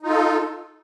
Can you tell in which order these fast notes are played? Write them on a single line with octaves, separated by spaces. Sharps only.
D#4 F4 A4